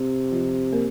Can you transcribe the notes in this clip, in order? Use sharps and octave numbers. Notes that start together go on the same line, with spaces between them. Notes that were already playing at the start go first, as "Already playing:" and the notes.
Already playing: C3
F3 F4
A#3 A#4